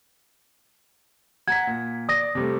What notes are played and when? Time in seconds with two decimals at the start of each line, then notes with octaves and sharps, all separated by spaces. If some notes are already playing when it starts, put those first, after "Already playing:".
1.48 F#5 A#5 G#6 B6
1.67 A#2
2.09 D5 D#6 A#6
2.35 C3 G3 A3